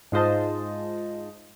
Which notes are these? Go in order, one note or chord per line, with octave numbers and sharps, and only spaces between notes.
G#2 G#3 F4 C5 D#5 A5